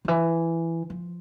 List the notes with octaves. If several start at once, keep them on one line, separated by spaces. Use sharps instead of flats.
D3
E3
F3